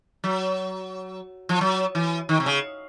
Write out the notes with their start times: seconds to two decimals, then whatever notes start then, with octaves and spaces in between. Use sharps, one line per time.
0.24 F#3
1.49 F3
1.61 F#3
1.95 E3
2.29 D#3
2.40 C3
2.46 C#3